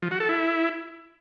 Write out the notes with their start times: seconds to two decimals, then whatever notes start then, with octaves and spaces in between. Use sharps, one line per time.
0.02 F3
0.11 F#4
0.20 A4
0.29 E4